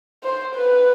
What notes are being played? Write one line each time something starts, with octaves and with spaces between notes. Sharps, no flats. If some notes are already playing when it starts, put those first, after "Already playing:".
C5
B4